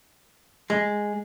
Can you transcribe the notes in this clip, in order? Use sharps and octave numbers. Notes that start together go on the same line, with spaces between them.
G#3